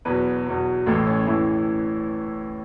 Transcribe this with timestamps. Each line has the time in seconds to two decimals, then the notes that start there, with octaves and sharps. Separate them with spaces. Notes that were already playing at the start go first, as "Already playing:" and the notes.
0.05 E2 B2 F#3 B4
0.46 E2 B2 F#3
0.86 A1 A2 E3 A4
1.07 C#4
1.27 A1 A2 E3 E4